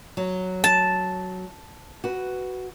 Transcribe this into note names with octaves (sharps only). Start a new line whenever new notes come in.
F#3
A5
F#4 B4